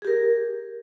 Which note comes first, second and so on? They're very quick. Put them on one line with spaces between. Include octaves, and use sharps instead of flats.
G#4 G4 A#4